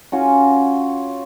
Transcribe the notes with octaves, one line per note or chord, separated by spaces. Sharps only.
C#4 F4 F#4 C#6